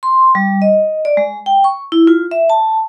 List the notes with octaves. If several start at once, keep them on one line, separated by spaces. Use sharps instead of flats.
C6
G3
D#5
D5
G#3
G5
C#6
E4
F4
E5
A5